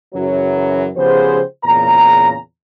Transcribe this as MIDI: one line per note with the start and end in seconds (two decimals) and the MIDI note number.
0.13 0.88 42
0.13 0.88 49
0.13 0.88 52
0.13 0.88 54
0.96 1.40 49
0.96 1.40 53
0.96 1.40 59
0.96 1.40 67
0.96 1.40 68
0.96 1.40 72
1.64 2.34 40
1.64 2.34 46
1.64 2.34 49
1.64 2.34 82